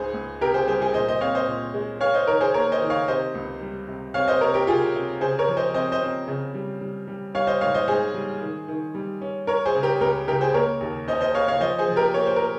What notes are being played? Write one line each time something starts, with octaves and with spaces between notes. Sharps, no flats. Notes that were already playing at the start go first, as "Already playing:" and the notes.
Already playing: C#2 G#2 G#4 C5
C#2
C3 G4 A#4
G#4 C5
G3 G#4 C5
G#4 C5
A#2 C5 D#5
C5 D#5
C4 C#5 F5
C5 D#5
A#2
G#3
C#4 C#5 F5
C5 D#5
D#3 A#4 C#5
G#4 C5
A#3 A#4 C#5
C5 D#5
D#3
C#5 F5
C3 C5 D#5
C#2
G3
C3
C4 C#5 F5
C5 D#5
C3 A#4 C#5
G4 A#4
C3 F4 G#4
C3
C#3 G#4 C5
A#4 C#5
F3
C5 D#5
C4 C5 D#5
C5 D#5
C4
C#3
G3
G3
G3
G3 C#5 F5
C5 D#5
G#2 C#5 F5
C5 D#5
G#2 G#4 C5
G3
D#3
D#3
G3
C#4
C#4 A#4 C#5
G#4 C5
C#3
G4 A#4
C#2 G4 A#4
C#3 G4 A#4
G#4 C5
A#3 A#4 C#5
D#2
C#4 C5 D#5
C5 D#5
C#4 C#5 F5
C#5 F5
F3 C5 D#5
G#4 C5
F3
G4 A#4
A#3 C#5
C5
A#4